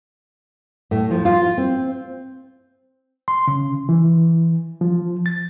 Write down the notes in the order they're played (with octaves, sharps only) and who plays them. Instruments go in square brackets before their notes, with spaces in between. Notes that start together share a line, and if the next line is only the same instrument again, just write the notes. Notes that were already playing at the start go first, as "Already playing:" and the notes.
[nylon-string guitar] A2
F3
F4
C4
[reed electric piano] C6
C#3
E3
F3
A6